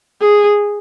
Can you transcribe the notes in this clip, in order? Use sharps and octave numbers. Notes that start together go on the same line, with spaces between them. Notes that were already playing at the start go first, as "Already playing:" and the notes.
G#4